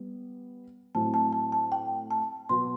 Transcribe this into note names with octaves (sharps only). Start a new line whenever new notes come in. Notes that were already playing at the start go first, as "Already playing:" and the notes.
Already playing: G3 B3
A2 F#3 C4 E4 A5
A5
A5
A5
G5
A5
B2 F#3 B3 F#4 C6